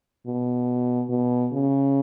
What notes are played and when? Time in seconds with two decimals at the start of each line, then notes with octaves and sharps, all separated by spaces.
0.26 B2
1.09 B2
1.52 C#3